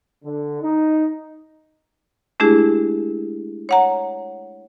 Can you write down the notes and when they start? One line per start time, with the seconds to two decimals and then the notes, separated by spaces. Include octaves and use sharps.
0.24 D3
0.62 D#4
2.40 G#3 A3 D4 E4 G4 G#4
3.69 C#5 F#5 A#5